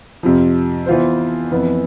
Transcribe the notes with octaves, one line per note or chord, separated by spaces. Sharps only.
F2 C3 F3
E3 B3 F4 C5
F2 E3 B3